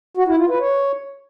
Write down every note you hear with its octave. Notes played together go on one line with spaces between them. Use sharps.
F#4
E4
F4
B4
C#5